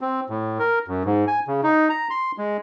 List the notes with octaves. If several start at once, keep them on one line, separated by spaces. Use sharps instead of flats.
C4
A2
A#4
F#2
G#2
G#5
C#3
D#4
A#5
C6
G#3